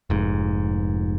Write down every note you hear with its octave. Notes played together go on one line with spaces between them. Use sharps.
F1 G#2